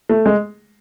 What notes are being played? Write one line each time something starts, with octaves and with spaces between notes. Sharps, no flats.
A3
G#3